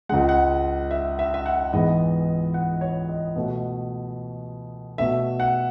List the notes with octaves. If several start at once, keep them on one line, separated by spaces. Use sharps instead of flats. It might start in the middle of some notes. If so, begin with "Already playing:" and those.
C#2 C#3 G#3 F#5
F#5
E5
E5
E5
F#5
G#2 E3 G#3 B3 D#5
F#5
C#5
D#5
B2 A3
B2 A3 E5
F#5